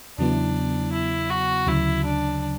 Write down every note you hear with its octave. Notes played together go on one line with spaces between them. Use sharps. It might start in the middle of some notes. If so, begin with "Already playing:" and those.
E2 C#3 F#3 B3 D4 E4
E4
F#4
D2 C#3 F#3 E4
D4